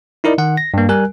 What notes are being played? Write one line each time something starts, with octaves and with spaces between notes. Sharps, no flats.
D#4 E4 A#4 D5 D#5
D#3 F#5
A#6
G2 A#3
G3 A#4 G#5 F#6